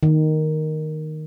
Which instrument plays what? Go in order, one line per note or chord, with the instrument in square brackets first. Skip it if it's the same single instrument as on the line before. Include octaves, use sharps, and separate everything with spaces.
[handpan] D#3